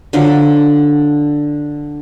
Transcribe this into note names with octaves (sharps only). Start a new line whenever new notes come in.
D3 F3 F#3